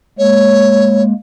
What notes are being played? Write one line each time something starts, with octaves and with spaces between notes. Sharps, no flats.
G#3 A#3 C#5